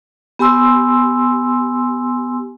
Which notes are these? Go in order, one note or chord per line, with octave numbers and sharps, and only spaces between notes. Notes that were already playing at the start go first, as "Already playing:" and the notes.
B3 G4 G#5 C6 E6